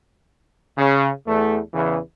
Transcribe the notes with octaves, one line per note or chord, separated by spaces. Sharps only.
C#3
E2 A3
E2 C#3 E3